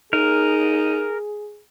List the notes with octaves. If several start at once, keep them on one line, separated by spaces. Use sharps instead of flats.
D#4 G#4 A#4